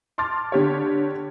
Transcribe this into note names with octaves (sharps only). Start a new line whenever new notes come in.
A5 C6 D6 F6 A6
D3 G4 C#5